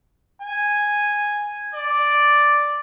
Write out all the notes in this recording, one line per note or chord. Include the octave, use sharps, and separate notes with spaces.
G#5
D5